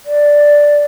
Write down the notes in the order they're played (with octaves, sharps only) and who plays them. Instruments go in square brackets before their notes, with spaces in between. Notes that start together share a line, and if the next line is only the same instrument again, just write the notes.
[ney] D5